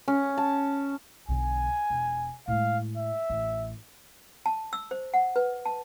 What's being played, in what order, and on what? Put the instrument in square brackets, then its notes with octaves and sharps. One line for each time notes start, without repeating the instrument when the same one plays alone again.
[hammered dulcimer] C#4
A5
[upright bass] B1 D3 [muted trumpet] G#5
[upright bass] E1
[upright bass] A2 G#3 [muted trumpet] F5
[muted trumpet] E5
[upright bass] A1
[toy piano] A5
E6
C5
F#5
B4
A5